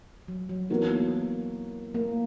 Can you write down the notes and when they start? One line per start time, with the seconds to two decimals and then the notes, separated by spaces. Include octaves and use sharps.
0.28 F#3
0.49 F#3
0.70 E3 A#3 B3 F#4 A#4
1.95 A#3